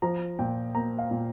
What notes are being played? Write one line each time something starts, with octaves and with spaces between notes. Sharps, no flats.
F3 A#5
A#2 G5
A#3 A#5
F5
A#2